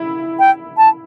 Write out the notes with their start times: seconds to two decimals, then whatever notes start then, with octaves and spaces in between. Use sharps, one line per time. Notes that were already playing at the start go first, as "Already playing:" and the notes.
Already playing: E4
0.39 G5
0.78 A5